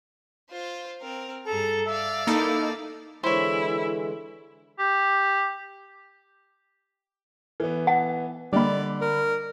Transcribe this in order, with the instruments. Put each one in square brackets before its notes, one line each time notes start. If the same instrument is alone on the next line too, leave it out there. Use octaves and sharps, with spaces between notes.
[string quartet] F4 C5
C4 A#4
[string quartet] G2 G#4 A#5 [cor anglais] A4
[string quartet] D5 F5 E6 [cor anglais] E5
[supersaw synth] A#3 D#4 A4 [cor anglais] E4
[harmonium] D3 E3 G#3 [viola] E4 [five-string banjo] C5 C#5
[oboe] G4
[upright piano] E3 B3
[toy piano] F#5 [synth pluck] A5
[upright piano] D3 D#5 B5 [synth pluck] G3 A#3 [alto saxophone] D5
[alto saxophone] A#4